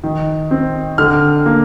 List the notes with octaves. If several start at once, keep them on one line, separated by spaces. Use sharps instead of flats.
D#3
C4
D3 F6
A#3